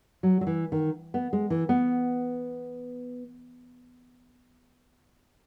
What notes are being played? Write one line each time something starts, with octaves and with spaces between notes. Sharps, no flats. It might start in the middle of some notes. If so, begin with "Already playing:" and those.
F#3
F#3
E3
D#3
B3
G#3
E3
B3